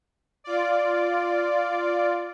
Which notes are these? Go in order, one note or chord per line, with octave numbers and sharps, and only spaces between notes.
F4 D5